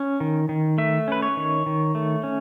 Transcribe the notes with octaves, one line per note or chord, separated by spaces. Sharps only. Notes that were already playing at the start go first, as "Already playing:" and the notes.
Already playing: C#4
D#3
D#3
A3 E5
C#4 B4
C#5
D#3
D#3
A3
C#4